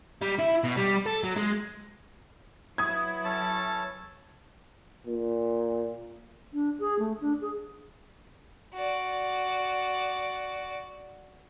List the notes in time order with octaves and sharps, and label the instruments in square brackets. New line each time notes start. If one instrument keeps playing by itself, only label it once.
[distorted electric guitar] G3
E4
B2
G3
A4
F#3
G#3
[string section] F#3 E4 B4 [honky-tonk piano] D#6 G#6
[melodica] C#4 A4 C#5 [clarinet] A5
[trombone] A#2
[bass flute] D4
G#4
A3
D4
G#4
[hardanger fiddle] F#4 D5